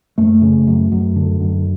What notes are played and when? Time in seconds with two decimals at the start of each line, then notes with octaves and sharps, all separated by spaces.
0.18 F#2 A3
0.42 C#3
0.67 F#2
0.92 F#2
1.16 D3
1.41 F#2